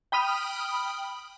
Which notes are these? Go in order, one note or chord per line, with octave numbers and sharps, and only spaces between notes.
G5 B5 D#6 F6